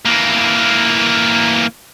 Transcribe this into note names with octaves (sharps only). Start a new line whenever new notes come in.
E3 A#3